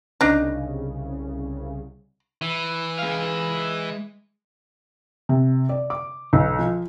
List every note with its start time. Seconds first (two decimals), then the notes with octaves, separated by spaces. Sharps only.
0.21 C2 C#3 D4 D#4
2.42 E3
2.98 G#3 F5
5.29 C3
5.69 D5
5.90 D6
6.33 B1
6.59 F3